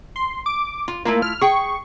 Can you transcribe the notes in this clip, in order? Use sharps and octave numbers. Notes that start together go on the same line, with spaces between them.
C6
D6
F4
A3 A#3 E4 F4
F6
G#4 G5 C#6